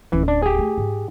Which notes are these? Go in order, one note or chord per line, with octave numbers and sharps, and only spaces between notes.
D1 E3 C#4
D4
G4 G#4
A3 E4
G#2